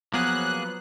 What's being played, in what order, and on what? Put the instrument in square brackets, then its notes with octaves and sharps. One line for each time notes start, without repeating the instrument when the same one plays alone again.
[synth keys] F3 F#3 B3 [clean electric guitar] A#3 G#4 [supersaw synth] F#6